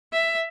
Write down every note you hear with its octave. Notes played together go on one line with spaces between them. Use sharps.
E5